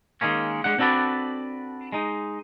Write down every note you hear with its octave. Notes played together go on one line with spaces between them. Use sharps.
D#3 G#3 A#3 C#4
G#3 D4 F#5
C4 D4 F#4 A4 B4 D5
G#3 D#4